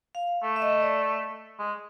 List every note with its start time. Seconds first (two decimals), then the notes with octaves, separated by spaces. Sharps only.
0.15 F5
0.43 A3
0.56 E5
0.62 D#5
0.82 D5
1.59 G#3